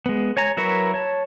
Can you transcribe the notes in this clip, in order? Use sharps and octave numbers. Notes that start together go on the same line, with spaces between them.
G#3 B3
C#5 G#5 A#5
F#3 E4 A#4 B4 C#6
C#5 A5